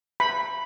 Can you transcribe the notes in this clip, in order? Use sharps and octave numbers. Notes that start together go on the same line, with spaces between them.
B5